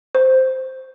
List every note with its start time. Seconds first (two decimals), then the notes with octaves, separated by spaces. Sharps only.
0.15 C5